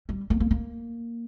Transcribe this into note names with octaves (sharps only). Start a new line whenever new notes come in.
G3
A#3
A#3
A#3